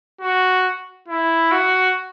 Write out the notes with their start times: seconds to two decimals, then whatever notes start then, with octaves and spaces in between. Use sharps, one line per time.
0.21 F#4
1.08 E4
1.52 F#4